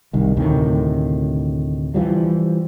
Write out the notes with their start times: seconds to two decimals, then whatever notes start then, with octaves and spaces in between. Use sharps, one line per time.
0.13 C2 D#3
0.37 D2 A2 C3 D#3
1.94 E3 F3 G3